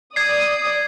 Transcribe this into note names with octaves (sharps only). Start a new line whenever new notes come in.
D5 D#6 G#6 C7